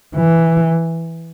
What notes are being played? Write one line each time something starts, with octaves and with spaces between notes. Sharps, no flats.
E3